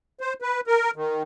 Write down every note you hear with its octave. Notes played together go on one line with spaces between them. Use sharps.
C5
B4
A#4
D#3